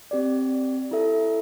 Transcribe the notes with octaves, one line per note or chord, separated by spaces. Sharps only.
C4 G4 D5
E4 A4 E5